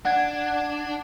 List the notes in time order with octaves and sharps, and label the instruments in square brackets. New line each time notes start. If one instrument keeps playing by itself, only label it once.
[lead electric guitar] D4 [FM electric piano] F#5 G#6